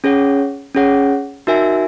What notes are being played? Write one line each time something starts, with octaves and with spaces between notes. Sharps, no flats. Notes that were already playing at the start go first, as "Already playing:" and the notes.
C#4 G#4 C#5 F#5
C#4 G#4 C#5 F#5
D#4 F#4 A#4 E5 G#5